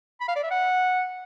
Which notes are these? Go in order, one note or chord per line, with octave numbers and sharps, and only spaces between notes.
B5
F5
D5
E5
F#5